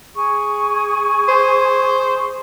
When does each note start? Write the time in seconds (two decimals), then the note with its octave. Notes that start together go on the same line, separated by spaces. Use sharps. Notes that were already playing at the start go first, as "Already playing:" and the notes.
0.14 G#4 C#6
1.28 C5